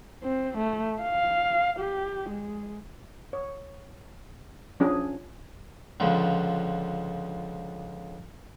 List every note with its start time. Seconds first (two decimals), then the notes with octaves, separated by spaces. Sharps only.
0.24 C4
0.58 A3
1.02 F5
1.79 G4
2.30 G#3
3.33 C#5
4.80 F3 C#4 D4 G#4
6.00 C#2 D3 F3